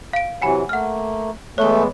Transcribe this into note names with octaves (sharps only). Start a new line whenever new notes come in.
F5 D7
C3 E3 F#3 F#5 G#5 B5
A3 A#3 F#5 F6
E3 G#3 A3 B3 C#5 G7